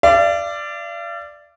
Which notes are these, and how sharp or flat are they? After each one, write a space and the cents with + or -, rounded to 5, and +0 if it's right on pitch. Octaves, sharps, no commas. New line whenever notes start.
D5 +0 F5 -45